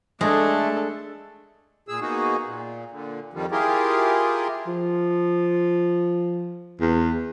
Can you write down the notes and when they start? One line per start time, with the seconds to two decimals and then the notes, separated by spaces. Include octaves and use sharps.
0.21 G#3 A3 D4 A4
1.88 A#2 G#4 E6
2.01 A#3 B3 D#4 F#4 G#4
2.46 A#2
2.91 A#2 D3
3.33 F2 D#3 F3 G3
3.51 E4 F4 G4 G#4 A#4
4.67 F3
6.81 E2